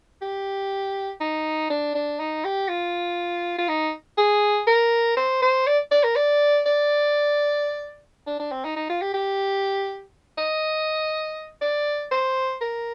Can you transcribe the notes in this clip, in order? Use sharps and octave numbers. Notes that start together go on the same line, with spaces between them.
G4
D#4
D4
D4
D#4
G4
F4
F4
D#4
G#4
A#4
C5
C5
D5
D5
A#4
D5
D5
D4
D4
C4
D#4
D#4
F4
G4
G4
D#5
D5
C5
A#4